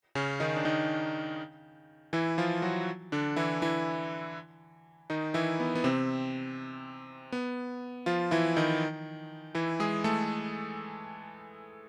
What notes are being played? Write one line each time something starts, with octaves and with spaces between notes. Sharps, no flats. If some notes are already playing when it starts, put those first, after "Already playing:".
C#3 C#4
D#3 D#4
D4
D#3 D#4
E3 E4
F3 F4
F#3 F#4
D3 D4
E3 E4
E3 E4
D#3 D#4
E3 E4
B3
B3
C3 C4
B3
F3 F4
E3 E4
D#3 D#4
E3 E4
G#3 G#4
A3 A4